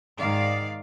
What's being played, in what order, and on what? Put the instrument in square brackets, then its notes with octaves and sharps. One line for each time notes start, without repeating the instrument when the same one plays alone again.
[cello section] G#2 D#3 D5 F5